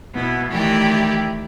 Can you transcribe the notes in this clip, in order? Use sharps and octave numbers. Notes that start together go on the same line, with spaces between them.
B2 B3 E4
D#3 E3 A3 E4 G4 D5